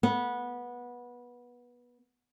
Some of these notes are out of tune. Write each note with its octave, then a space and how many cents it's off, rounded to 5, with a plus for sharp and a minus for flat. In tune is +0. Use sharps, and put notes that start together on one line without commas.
B3 -20